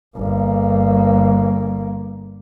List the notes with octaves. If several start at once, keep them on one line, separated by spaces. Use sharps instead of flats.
G1 A#3